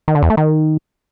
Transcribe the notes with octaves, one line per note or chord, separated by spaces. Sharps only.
D#3
D3
E2
A3
D#3